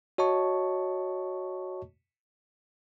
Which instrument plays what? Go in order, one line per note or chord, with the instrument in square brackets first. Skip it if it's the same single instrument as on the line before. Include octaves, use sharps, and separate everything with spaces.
[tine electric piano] F#4 C#5 D#5 A5 C#6